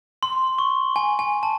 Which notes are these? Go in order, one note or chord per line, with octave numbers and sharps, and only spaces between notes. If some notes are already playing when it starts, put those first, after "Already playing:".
C6
C#6
G#5
G#5
A5